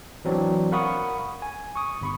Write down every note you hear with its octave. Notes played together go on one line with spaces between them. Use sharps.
E3 F#3 C4 D4 D5
A#4 F5 F#5 B5 C#6 D#6
G#5
C#6 D#6
G1 B5 C#6